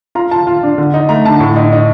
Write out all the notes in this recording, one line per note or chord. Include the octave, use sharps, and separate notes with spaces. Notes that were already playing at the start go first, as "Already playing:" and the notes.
F4 A#5
F4 A5
F4
D4
D3
D#4
A3 A#5
D3 A5
A2
D#4
D#4